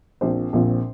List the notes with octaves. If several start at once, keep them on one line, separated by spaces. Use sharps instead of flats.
A#1 A#2 F3 C4 C5
A#1 A#2 F3 C4